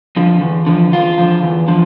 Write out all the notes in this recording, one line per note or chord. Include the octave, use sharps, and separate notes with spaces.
D3 F3
E2
D3 F3
E2 F4
D3 F3
E2
D3 F3